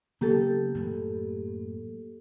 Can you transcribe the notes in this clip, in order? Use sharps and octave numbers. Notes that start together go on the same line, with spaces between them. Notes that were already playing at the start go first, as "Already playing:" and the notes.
C#3 F#3 A#3 B3 G4 A4
F#2 A2 E3